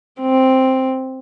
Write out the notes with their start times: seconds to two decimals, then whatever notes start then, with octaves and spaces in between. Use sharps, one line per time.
0.21 C4